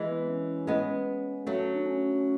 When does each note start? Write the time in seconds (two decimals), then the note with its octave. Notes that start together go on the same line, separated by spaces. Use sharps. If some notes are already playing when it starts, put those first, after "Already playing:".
Already playing: E3 G#3
0.09 B3
0.28 C#4
0.67 G#3 B3
1.07 C#4
1.47 F#3 A3
1.73 D4
1.86 C#4